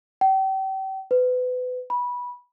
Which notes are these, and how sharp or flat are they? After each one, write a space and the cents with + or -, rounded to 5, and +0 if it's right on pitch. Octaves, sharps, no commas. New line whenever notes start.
G5 -35
B4 +30
B5 -15